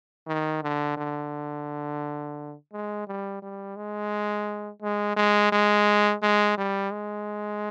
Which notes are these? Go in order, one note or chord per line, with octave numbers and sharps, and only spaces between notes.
D#3
D3
D3
G#3
G3
G3
G#3
G#3
G#3
G#3
G#3
G3
G#3